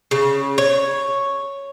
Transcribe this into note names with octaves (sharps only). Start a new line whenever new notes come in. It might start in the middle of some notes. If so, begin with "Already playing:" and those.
C#3
C#5